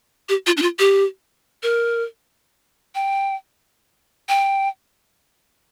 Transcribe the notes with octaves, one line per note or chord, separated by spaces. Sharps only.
G4
F4
D4
F4
G4
A#4
G5
G5